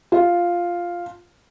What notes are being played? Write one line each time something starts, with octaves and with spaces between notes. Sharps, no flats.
F4